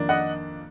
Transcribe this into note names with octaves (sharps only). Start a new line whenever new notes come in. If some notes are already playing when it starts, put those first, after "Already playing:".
Already playing: F2 D#3 A#3 D4
D#5 F#5